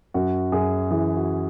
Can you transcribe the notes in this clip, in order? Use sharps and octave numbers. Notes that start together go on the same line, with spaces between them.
F#2 F#4
F#2 G#4
E3 G#4
F#4